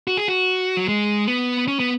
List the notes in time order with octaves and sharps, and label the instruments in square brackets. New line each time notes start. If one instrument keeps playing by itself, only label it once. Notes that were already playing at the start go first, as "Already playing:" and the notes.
[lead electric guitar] F#4
G#4
F#4
F#3
G#3
B3
C#4
B3